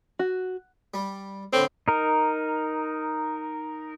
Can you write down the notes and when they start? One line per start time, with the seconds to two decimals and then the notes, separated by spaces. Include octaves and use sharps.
0.19 F#4
0.94 G3
1.53 A2 D3 C4
1.88 D#4 A#4